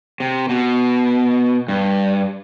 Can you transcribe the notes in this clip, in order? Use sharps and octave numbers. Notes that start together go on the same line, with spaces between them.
C3
B2
G2